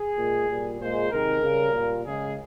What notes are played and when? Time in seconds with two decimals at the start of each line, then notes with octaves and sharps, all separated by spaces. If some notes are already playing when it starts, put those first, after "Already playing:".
Already playing: G#4
0.17 A#2 G#3
0.49 A#2 G3
0.80 A#2 G#3 C5
1.11 C3 D#3 G#3 A#4
1.42 C#3 G3
1.74 A#2 G3
2.05 C#3 G#3 G#4